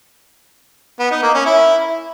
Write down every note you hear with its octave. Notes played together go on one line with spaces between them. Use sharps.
B3
D#4
A#3
C#4
E4